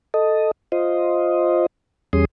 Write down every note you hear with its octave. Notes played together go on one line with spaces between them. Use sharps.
A4 D#5
F4 C5 D#5
E2 G3 C#4 G#4 C6 D#6